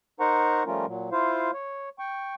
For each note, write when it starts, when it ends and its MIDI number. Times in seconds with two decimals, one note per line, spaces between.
0.20 0.63 63
0.20 0.63 70
0.20 0.63 72
0.20 0.63 78
0.20 0.63 82
0.20 0.63 85
0.66 0.86 53
0.66 0.86 55
0.66 0.86 57
0.66 0.86 61
0.66 0.86 65
0.66 0.86 70
0.87 1.10 46
0.87 1.10 54
1.12 1.51 64
1.12 1.51 65
1.12 1.51 72
1.12 1.51 77
1.54 1.89 73
1.99 2.35 79
1.99 2.35 85